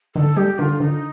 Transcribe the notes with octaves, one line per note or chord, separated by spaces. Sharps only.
D3 A4
G3 G4
D3 F4
D3 D#4